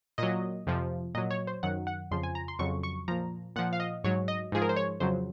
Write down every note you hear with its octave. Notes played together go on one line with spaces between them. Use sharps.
A#2 F#3 D#5
F2 C3 F3
A#2 F#3 D#5
C#5
C5
F#2 D#3 F#3 F#5
F#5
F2 C#3 F3 C6
G#5
A#5
C6
F2 C#3 F#3 C#6
C#6
A#2 F3 A#5
A#2 F3 F#5
F5
D#5
G#2 F#3 C#5
D#5
G#2 F3 G#4
A#4
C5
C#5
F2 C#3 F#3 C5